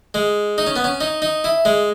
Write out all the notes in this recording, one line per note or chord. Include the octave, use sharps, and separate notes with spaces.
G#3
D#4
C#4
B3
C#4
D#4
D#4
E4
G#3